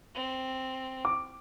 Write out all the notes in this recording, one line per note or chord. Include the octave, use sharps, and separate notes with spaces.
C4
D6